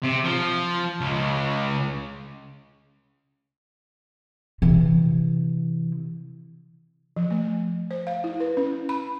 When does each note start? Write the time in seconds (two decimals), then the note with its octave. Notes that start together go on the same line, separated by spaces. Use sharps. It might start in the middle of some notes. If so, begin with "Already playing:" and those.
0.04 C3
0.25 F3
1.00 C#2
4.62 C3 E3
7.17 F3
7.31 A3
7.91 C5
8.07 F5
8.24 E4
8.40 B4
8.57 C#4
8.89 B5